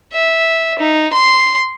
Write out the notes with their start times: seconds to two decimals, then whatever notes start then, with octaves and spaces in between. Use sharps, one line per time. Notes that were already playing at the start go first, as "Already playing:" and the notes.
0.13 E5
0.79 D#4
1.13 C6